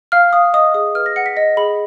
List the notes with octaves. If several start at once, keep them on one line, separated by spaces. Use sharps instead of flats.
F5 F6
F5 D#6
D#5 D#6
G#4 D#6
B4 F6
A#6
F#5 C#7
B6
D#5 A#6
G#4 B5